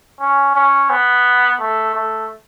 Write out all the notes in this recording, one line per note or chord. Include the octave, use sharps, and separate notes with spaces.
C#4
C#4
B3
A3
A3